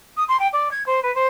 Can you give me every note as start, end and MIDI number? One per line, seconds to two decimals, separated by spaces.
0.16 0.24 87
0.28 0.37 84
0.39 0.47 79
0.52 0.68 74
0.71 0.83 92
0.86 1.00 72
1.02 1.13 71
1.14 1.27 72